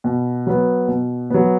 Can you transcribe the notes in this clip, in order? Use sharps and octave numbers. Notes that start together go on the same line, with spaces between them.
B2
F#3 B3
B2
F#3 B3